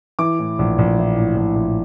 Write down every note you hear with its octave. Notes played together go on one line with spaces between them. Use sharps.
E3 D6
A2
A#1
A#1
E3
A2
A#1
A#1